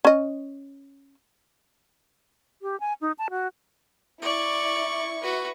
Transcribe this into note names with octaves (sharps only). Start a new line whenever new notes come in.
C#4 D#5
G4
G#5
D#4
A5
F#4
E4 D5 C#6
F#4 B4